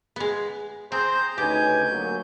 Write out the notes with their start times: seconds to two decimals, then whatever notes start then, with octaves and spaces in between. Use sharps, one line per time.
0.16 G#3 B3
0.92 C4 G#4 C5 A#5 G6
1.38 D2 C#3 D#4 G4 B4 G#5 G6
1.90 F#3 A#3